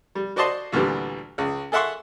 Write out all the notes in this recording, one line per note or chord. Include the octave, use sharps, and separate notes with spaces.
G3
F#4 C5 D5 D#5 A5 C6
D2 A#2 D3 E3 G3
C#2 C#3
G#4 A4 E5 F#5 C6 C#6